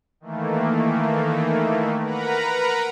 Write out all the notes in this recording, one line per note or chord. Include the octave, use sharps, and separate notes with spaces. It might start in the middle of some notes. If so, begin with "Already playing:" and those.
D#3 E3 A3 A#3
A#4 B4 F#5 A#5 B5